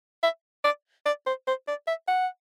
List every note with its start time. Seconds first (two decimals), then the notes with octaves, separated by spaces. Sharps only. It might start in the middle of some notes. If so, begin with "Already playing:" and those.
0.23 E5
0.64 D5
1.06 D5
1.26 C5
1.47 C5
1.68 D5
1.87 E5
2.08 F#5